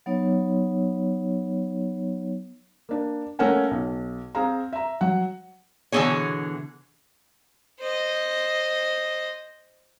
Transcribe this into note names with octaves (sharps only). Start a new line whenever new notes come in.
F#3 B3 D#4 C#5
A#3 D4
A3 A#3 C#4 A#4 F#5 G#5
B1
C4 G#4 F5 A#5
E5 A#5
F#3 F#5
B2 D3 E3 C#4 G#4 C#5
C5 D#5